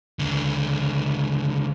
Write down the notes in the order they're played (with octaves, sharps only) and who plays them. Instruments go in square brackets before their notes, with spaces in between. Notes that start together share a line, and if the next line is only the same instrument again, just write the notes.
[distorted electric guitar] C#2 D3